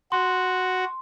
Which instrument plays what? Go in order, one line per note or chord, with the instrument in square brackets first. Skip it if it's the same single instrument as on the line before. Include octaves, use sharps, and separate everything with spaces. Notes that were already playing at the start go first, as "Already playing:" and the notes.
[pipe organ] F#4 [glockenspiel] C6